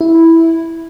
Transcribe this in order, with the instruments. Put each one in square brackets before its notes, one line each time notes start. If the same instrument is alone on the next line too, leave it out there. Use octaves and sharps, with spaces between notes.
[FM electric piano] E4